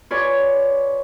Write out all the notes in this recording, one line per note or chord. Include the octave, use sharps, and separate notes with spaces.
F4 F#4 B4 C#5 D5 G#5